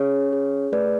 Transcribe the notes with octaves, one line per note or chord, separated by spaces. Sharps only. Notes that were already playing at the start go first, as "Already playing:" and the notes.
Already playing: C#4 G#4 C#5
G#4
A3 B4 D5